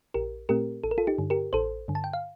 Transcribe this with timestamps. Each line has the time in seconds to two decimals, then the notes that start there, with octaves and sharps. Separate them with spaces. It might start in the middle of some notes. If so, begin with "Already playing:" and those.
0.14 A#1 G4 A#4
0.49 A#2 A3 C4 G4 A#4
0.84 A1 A4
0.91 A#4
0.98 F4 A4
1.07 D#4 G4
1.18 G2 D3
1.30 G4 A#4
1.53 A1 A4 C5
1.88 G2 D3
1.95 A5
2.04 G5
2.13 F5